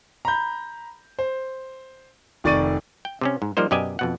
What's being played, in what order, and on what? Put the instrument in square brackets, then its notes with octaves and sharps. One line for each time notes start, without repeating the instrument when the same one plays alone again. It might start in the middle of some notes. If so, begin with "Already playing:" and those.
[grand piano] A#5 B5 G6
C5
F1 D#3 D5 C#6 A6 D#7
[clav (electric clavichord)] G5
C3 C4 C#4
G#2
F3 G3 A#3 D#4 C5
F#2 B2 G4 D5 D#5 G#5
F2 B2 F#5